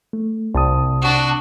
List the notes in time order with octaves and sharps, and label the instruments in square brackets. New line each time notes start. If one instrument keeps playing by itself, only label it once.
[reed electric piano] A3
[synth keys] C2 [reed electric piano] C3 A5 D#6
[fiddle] D4 F#4